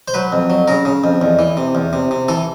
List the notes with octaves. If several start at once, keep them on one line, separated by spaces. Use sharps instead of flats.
C5
F#3 B4
F2
F#3
C#3 A#4
C#3
F2
E2
E3
C3
E2
C3
C3
E3 A4